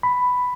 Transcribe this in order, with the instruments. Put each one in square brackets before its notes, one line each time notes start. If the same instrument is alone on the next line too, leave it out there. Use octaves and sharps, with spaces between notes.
[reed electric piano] B5